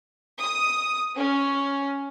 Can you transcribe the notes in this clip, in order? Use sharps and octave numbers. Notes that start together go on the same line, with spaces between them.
D#6
C#4